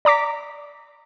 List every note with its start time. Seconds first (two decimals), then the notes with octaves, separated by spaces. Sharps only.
0.05 D5 A#5 D6 B6